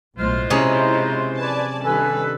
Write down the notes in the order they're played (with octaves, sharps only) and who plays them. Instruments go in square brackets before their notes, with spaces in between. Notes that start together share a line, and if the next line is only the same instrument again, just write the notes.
[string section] B1 A2 [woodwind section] G#3 F4 C5 [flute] F6
[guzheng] C3 C#4 G#4 [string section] E4 D#5 [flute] A#5
[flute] B4 [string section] D5 G#5 A5
[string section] G2 D#3 [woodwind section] A4 B4 [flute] G#5